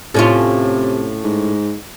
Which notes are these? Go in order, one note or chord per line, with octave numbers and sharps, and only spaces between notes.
A2 C3 C#4 F4
G#2